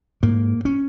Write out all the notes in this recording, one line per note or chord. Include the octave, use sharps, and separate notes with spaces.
G#2 A#3
C#4